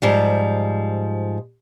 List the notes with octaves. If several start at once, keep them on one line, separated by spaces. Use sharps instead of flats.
G#2 F3 G3